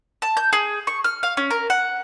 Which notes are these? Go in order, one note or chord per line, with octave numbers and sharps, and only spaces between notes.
A5
G6
G#4
C#6
F6
F5
C#4
A#4
F#5